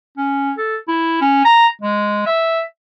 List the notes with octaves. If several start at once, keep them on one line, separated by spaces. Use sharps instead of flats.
C#4
A4
E4
C#4
A#5
G#3
E5